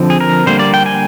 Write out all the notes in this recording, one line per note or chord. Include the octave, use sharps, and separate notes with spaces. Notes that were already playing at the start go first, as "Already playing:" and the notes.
Already playing: D3 F3 C4
G#4
A#4
D3 G3 A#3 C5
D5
G5
G#5